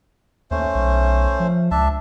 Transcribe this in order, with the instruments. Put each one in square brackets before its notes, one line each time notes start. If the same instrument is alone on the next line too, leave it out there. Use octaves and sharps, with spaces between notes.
[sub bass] D#2 [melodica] A3 C#4 C5
[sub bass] B1
F3
[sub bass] C#2 [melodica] D4 E5 A5